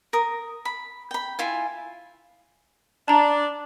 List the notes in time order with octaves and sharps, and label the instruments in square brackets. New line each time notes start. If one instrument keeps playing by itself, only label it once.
[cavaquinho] A#4 D#6
B5
G5 B5
E4 F4 G#5
[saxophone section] D4 [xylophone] A5 A#5